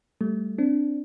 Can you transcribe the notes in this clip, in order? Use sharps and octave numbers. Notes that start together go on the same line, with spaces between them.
G3 A3
C4 D4